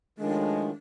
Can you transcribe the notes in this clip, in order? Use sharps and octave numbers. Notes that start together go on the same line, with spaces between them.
A2 D#3 F3 G#3 D4